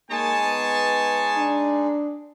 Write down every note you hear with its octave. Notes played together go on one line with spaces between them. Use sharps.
G#3 A#3 D#4 G#4 C#5 G#5 A5
B3
D4